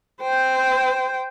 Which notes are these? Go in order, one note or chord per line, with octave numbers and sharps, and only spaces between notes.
C5 G5